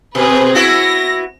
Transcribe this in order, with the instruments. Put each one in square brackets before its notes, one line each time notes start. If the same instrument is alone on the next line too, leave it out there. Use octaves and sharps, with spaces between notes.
[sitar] B2 [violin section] C4 G#4 B4
[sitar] B3 E4 F#4 [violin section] A#6